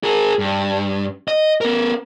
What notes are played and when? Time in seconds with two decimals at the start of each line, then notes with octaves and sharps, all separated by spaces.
0.03 G#4 A#4
0.39 G2
1.28 D#5
1.61 B3 A#4